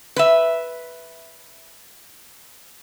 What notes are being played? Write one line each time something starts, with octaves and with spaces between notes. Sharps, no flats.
B4 E5